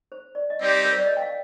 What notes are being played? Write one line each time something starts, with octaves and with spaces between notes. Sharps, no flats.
C5
D5
D#5
G3 C4 D#4 G4 C5 D5
A#4
C5
D5
D#5
G5
F5